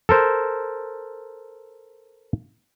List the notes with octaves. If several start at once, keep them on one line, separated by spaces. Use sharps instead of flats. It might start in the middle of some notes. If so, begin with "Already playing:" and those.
A4 A#4 C5